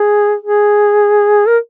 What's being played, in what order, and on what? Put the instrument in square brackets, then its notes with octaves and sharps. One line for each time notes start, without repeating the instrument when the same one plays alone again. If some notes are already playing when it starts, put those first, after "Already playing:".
Already playing: [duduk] G#4
G#4
A#4